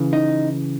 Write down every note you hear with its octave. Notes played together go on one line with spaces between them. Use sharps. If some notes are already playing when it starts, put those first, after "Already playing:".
Already playing: C#3 E3
D#4